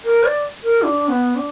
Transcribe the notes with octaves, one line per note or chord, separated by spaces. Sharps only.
A#4
D5
A#4
D4
B3
D4